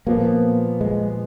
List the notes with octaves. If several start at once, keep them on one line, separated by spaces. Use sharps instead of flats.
A#2 F3 A#3 B3
G#3